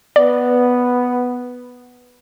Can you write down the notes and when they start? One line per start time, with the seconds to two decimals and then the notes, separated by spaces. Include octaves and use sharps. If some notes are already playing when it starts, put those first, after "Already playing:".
0.16 B3 D5